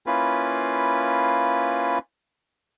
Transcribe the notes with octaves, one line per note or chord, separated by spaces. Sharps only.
A#3 C#4 E4 F4 B4